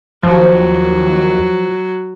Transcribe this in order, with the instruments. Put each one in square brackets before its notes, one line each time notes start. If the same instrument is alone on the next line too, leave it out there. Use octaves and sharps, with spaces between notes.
[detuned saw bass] D#2 [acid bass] F3 [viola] F#3